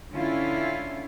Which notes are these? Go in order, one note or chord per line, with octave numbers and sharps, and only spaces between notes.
D3 C#4 E4 F4